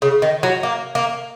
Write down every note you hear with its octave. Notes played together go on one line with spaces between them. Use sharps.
C#3
D#3
F#3
A#3
A#3